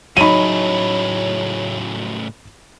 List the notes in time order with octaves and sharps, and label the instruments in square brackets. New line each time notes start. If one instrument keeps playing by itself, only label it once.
[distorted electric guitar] A2 C#3 [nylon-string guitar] F#3 D#4 [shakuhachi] C#5 [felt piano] B5 D#7